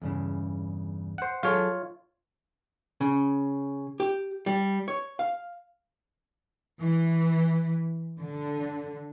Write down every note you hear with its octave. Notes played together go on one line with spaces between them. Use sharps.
E2 G2 C#3
C5 F#5
F#3 F4 G#4 A4 C#5
C#3
G4
G3
C#5
F5
E3
D3